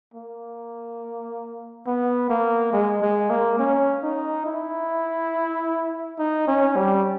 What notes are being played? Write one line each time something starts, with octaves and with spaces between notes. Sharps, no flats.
A#3
B3
A#3
G#3
G#3
A#3
C#4
D#4
E4
D#4
C#4
G3